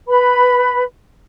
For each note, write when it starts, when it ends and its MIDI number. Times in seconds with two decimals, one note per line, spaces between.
0.07 0.83 71
0.07 0.83 83